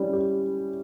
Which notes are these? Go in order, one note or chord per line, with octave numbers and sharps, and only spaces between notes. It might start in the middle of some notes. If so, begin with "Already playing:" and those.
Already playing: G3 C#4 E4 G4
G4